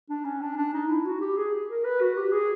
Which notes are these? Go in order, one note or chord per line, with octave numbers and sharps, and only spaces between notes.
D4
C#4
D4
D4
D#4
E4
F#4
G4
G#4
A#4
B4
F#4
G4
G#4